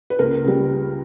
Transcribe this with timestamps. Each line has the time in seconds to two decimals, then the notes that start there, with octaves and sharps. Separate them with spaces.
0.10 B4
0.19 C#2 A#3 A#4
0.44 C#3 G3